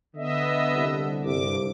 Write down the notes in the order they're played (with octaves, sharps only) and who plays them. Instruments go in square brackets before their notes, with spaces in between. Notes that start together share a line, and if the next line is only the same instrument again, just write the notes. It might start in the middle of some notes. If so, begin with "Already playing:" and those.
[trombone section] D3 [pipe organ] B3 D#5 E5
[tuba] C2
[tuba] C2 [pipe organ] G2 D6